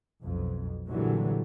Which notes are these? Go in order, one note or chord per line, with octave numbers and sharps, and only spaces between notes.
B1 F2
A#2 D3 E3 F#3 G3